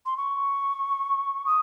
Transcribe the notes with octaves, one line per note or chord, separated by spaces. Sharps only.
C6
C#6
D#6